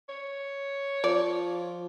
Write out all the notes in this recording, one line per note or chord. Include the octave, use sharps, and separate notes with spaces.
C#5
F3 D5